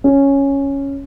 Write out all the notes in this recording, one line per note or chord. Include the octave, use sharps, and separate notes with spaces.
C#4